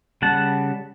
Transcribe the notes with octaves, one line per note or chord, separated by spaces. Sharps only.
C#3 G3 F#5 A5